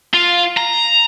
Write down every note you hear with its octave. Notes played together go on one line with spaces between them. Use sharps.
F4
A#5